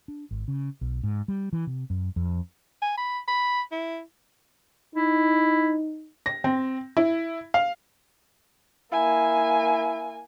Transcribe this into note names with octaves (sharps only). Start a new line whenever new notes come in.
D4
G#1
C#3
B1
G#2
G3
E3
C3
F#2
F2
G#5
B5
B5
E4
D#4 E4
A#6
C4
E4
F5
A#3 E4 G#5